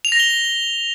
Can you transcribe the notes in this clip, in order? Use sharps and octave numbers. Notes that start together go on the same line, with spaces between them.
F7
A#6
G7